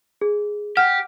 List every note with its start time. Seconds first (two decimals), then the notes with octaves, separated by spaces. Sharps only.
0.21 G#4
0.77 G4 F#5 F6 G6